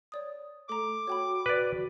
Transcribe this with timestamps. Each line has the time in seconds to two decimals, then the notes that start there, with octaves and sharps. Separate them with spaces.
0.12 C#5 D5 D#6
0.69 A3 A4 A#5 D6
1.07 F#4 C#5 G5 B5
1.46 B4 D5